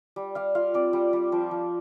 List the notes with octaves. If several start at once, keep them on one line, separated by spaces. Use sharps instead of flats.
G3
G3 F5
F4 F5
C4 D5
G3
G3
F3 C5
F3